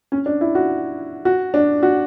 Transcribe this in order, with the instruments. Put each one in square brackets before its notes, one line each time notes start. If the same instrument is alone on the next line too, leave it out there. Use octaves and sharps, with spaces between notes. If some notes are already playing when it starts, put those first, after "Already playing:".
[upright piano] C#4
D4
E4
F#4
F#4
D4
F#4